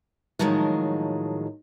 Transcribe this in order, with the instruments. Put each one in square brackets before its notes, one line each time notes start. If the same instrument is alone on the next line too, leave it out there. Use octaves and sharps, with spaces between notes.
[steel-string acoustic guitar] A2 D#3 F3 F#3 G#3